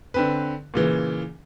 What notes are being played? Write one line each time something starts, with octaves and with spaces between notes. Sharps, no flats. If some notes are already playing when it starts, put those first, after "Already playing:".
D3 C4 B4
A#2 C#3 E3